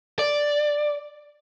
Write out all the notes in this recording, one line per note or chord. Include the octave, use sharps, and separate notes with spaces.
D5